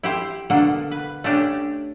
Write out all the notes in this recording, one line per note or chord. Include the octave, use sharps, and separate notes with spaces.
E4 G4 C5
B2 D3 A#3 D4 A4 F#5
B4
A3 C#4 D4 G4